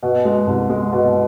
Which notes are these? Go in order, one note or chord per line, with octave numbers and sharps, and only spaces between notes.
B2
G#3
C2
G#3
B2